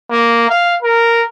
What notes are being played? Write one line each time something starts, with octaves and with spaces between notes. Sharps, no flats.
A#3
F5
A#4